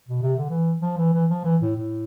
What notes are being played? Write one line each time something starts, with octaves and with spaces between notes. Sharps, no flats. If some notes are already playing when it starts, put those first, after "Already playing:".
B2
C3
D3
E3
F3
E3
E3
F3
E3
A2
A2